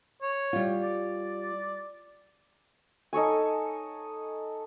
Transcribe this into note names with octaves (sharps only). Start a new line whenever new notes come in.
C#5
G3 F4
D5
D#4 A4 C#5 G#5